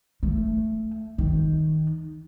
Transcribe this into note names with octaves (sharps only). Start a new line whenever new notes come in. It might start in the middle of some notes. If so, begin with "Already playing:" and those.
A3
D#3